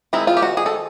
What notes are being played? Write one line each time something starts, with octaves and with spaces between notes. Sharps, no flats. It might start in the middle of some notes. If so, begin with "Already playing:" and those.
D#3 G#3 C4 E4
F4
G4
F#4
G#4
A4